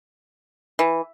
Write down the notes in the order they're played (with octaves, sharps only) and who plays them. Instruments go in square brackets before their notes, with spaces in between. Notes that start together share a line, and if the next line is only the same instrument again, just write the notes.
[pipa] E3